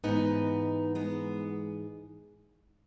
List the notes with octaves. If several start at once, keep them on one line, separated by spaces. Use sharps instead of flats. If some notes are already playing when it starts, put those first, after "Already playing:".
G#2 E3 B3 D#4
G#3 B3